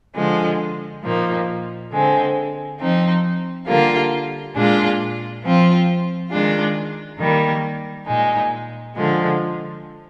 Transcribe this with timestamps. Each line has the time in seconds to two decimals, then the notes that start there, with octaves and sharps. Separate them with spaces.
0.14 D3 F3 G#3
1.02 A#2 F3 A#3 D#4
1.90 D3 G#3 C4
2.79 F3 C4 D#4
3.66 D3 G3 A#3 F4
4.54 A#2 G#3 D4 F4
5.43 F3 C4 F4
6.30 D#3 G#3 D4 F4
7.18 D#3 G3 A#3
8.06 A#2 G#3 D#4
8.95 D3 F3 G#3